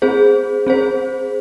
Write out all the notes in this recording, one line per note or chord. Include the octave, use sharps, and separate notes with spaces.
C4 G#4 C5
C4 G#4 C5